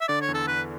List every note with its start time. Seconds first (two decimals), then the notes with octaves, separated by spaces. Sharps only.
0.01 E5
0.08 D3 D5
0.22 C#5
0.28 E2
0.34 A4
0.48 E2 B4